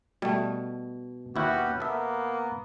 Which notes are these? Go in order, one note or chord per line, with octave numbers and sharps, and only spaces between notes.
B2 G3 A3
D#2 B3 C#4 E4 F#4 G4
A#3 B3 A4 E5